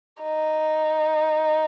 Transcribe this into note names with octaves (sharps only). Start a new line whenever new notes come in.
D#4